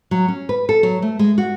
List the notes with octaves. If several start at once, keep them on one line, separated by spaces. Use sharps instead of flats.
F#3
C#4
B4
A4
F#3
A3
G#3
F#4